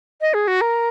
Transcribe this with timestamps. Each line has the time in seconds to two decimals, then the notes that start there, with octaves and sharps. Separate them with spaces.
0.21 D#5
0.34 G#4
0.48 F#4
0.61 A#4